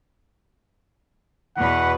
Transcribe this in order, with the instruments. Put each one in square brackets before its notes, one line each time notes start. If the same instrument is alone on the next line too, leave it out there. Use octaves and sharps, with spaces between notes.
[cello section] E2 B2 B4 [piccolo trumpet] F#5